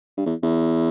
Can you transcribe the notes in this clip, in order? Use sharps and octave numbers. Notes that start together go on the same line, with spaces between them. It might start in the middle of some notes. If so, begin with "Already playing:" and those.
G2
E2
E2